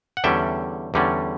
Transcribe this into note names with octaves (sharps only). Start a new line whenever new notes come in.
F#5
E2 D3 G3 C#4 E5 G5
E2 D3 G3 C#4